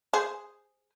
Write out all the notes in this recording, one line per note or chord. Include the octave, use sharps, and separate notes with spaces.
G#4 C5